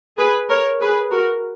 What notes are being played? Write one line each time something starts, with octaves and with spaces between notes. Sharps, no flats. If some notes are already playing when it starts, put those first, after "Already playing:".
G#4 B4
A#4 C#5
G#4 B4
F#4 A#4